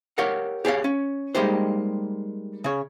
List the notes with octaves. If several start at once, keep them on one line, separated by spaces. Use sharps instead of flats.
G4 A#4 C#5 F5 F#5
G4 G#4 C#5 F5
C#4
G3 G#3 A#3 D#4 G4 C5
C#3 C#5